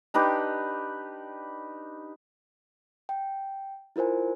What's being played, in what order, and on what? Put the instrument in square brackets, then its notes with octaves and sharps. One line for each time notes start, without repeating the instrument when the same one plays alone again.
[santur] D4 D#4 G4 B4
[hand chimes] G5
E4 F4 A#4 C5 G#5